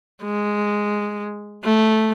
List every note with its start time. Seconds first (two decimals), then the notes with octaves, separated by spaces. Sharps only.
0.23 G#3
1.64 A3